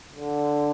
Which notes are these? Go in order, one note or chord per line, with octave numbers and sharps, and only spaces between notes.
D3